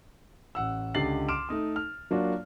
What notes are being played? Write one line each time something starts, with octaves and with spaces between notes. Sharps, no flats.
A1 F#5 E6
C#2 D3 G4 A6 C7 F#7
C6 D6 F6 D7 E7
A3 D#4 D#6
F6
F#3 A#3 D4 F4 F#4